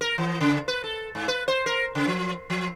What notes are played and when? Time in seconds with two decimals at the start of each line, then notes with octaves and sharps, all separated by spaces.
0.01 A#4
0.18 E3
0.41 C#3
0.68 B4
0.84 A4
1.15 G#2
1.28 B4
1.48 C5
1.66 A#4
1.95 C#3
2.07 F3
2.50 F3